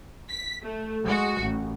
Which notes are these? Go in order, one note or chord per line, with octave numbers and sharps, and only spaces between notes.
B6
A3
G#3 F#4
A1